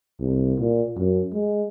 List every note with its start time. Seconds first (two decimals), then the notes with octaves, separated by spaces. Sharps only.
0.21 C2
0.59 A#2
0.97 F#2
1.33 G#3